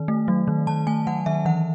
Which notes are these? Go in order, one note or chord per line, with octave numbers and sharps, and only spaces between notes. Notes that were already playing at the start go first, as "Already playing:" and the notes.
Already playing: D#3
A3
F#3
D#3
D#3 A5
A3 G#5
F#3 F#5
D#3 E5
E3 F#5